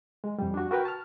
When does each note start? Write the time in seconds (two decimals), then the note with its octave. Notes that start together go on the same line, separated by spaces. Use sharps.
0.24 G#3
0.39 F2 G3
0.54 D4 F#4
0.71 F#4 A#4 B4 G5
0.85 A5 F6